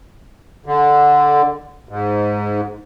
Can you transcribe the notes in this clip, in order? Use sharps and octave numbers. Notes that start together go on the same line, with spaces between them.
D3
G#2